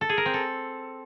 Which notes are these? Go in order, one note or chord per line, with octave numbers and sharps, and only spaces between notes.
A4
G#4
A#4
C4
A4